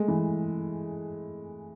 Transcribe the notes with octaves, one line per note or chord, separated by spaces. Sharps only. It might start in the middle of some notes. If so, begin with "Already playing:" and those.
Already playing: G#3 A3
E3